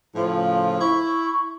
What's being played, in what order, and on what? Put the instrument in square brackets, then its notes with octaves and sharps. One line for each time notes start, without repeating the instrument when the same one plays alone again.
[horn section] A2 C#3 F3
[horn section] E4 [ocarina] C#6